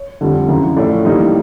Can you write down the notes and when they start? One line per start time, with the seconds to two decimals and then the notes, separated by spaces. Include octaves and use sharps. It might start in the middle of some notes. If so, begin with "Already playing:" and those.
Already playing: C#5
0.21 F2 D3 G3
0.48 F#2 C#3 E3
0.77 A2 F3 A3 C#4 D5
1.05 A2 E3 G3 A#3 D#4